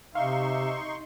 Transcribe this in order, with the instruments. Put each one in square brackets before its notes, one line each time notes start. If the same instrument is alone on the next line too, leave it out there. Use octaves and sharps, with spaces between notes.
[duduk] C3 [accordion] D#4 C6 C#6 [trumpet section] E5 [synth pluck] F5